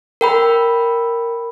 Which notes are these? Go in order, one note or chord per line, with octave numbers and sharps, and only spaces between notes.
A#4 G5 B5